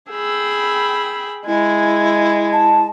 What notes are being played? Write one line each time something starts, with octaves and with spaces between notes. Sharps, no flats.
G#4 G5 B5 E6
G#3 E4 G#5
A5